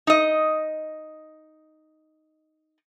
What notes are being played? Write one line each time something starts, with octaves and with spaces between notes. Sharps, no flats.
D#4 D#5